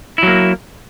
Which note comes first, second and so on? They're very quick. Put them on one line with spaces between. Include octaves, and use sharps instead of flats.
E4 F#3 A#3